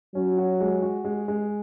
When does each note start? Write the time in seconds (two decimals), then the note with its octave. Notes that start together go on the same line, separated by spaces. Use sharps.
0.15 F#3 C#4
0.37 F#4
0.60 G#3
0.82 F#4
1.04 G#3
1.28 G#3